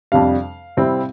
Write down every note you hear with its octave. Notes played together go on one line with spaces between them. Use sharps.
F2 C3 G3 D4 F5
C3 G3 C4 E4